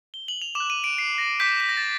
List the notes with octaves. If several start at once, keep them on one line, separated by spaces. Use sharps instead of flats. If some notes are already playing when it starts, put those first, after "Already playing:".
G7
F#7
F7
D6 E7
F#6
D#7
D7
C7
A#6
D6 G6 B6
B6
A#6
A6